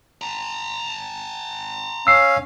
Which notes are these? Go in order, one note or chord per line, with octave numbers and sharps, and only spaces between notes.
A5 A#5
C#4 F5 E6 C7